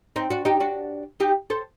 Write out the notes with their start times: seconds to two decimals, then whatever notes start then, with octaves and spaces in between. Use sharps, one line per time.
0.16 C4 D#4
0.30 D4 F#4
0.45 D#4 G4
0.60 D4 F#4
1.20 D#4 G4
1.50 A4 C5